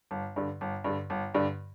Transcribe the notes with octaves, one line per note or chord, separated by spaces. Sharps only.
G1
G2 D3
G1
G2 D3
G1
G2 D3